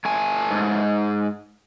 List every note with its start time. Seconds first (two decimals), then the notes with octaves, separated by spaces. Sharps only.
0.05 A3 G#5
0.51 G#2